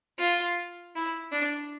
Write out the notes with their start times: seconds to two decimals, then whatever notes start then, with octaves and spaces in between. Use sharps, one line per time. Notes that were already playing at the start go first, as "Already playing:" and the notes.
0.19 F4
0.95 E4
1.32 D4